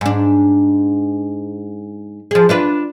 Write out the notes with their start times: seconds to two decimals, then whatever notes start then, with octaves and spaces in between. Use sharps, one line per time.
0.01 G#2 D4
2.31 F3 G#4
2.49 D4 F4 B4